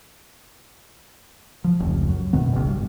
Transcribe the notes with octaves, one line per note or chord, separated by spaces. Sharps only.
F3
F1 C#2
F#2
F#2 B2 D#3 B3
F#1 C#2
G2